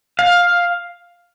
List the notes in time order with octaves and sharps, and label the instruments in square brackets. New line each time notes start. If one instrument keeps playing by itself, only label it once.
[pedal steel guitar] F5